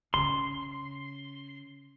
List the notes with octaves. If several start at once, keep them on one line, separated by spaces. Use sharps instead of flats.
C#3 C6